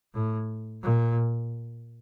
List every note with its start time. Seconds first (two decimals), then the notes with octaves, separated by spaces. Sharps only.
0.14 A2
0.83 A#2